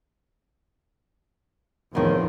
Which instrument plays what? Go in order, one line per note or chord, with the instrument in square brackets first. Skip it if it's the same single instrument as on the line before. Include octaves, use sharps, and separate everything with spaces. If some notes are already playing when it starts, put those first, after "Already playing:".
[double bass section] E2 F3 C4 [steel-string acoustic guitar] A2 D#3